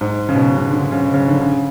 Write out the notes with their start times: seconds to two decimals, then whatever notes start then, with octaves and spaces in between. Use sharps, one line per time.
0.01 G#2
0.29 C#3
0.35 B2
0.58 C#3
0.69 D3
0.92 C#3
1.14 C#3
1.28 D3
1.41 C#3